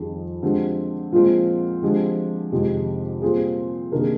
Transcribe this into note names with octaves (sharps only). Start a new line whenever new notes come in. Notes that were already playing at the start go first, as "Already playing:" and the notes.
Already playing: F2 D#3 G3 G#4
D3 F3 G#3 C4 G4
A#2 F3 G#3 C4 F4
D3 F3 G#3 C4 G4
F2 C3 D#3 G#3 G4
A#2 G3 C4 G#4
C3 D#3 A#3 D4 A#4
G#4